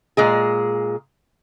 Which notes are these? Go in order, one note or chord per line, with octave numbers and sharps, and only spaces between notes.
A#2 G#3 G#4